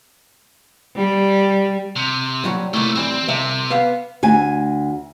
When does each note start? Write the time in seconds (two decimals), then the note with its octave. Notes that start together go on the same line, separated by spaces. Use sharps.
0.96 G3
1.96 C3
2.44 A#2 F#3 G3
2.73 A2 C3 A3 A#3
2.95 A2 E3 G3 C4
3.28 C2 C3 E5
3.70 B3 F5
4.23 D2 G#5